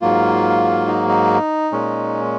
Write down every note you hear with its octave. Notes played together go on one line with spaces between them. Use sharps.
G#2 F#3 A#3 F4
D#4
D#4
A#2 G#3 C#4